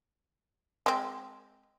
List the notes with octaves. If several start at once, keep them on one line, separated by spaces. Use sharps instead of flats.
G#3 C4